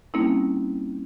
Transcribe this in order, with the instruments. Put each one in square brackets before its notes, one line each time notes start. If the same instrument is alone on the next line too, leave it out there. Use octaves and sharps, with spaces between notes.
[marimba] G3 A#3 C4 C#4 D#4 E4